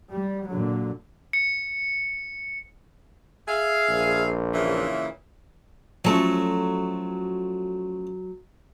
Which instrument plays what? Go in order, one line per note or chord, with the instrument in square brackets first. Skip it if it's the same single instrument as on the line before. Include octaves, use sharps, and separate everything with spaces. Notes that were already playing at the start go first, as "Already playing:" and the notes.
[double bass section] G3
A#2 D3 F#3
[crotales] C#7
[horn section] G#4 E5 F5
[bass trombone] A#1
[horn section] A#2 C#3 E3
[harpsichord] F3 A3 C#4 [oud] F#3 A4